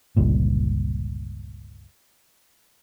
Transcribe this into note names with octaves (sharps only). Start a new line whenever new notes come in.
G1 C#2 G2 A#2